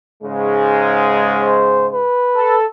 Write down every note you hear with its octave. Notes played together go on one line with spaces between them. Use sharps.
G#2 C#3 G#3
C5
B4
A4